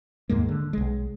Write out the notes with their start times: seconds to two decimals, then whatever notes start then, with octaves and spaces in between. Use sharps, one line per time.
0.29 D#2 G#2 G#3 A#3
0.49 D3
0.73 B1 G#3